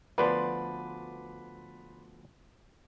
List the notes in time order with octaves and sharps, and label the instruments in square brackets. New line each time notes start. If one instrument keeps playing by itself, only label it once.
[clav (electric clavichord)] D2 F3 B3 [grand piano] B4 D5 C6